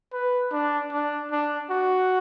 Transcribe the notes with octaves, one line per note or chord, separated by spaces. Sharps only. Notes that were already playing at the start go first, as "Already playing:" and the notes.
B4
D4
D4
D4
F#4